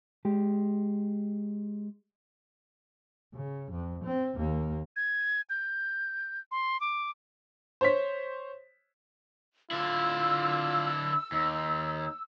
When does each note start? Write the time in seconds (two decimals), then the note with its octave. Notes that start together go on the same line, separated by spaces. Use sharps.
0.25 G#3 G4
3.34 C#3
3.72 F2
4.04 C4
4.36 D#2 A#3
4.96 G#6
5.50 G6
6.51 C6
6.81 D6
7.81 C5 C#5 B6
9.71 D3 E4 F4 E6
11.32 D#2 D#4